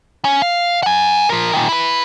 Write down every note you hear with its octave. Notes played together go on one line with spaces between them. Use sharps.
C#4
F5
F#5 G#5
F3 A#4
A#2 D#3
E4 B4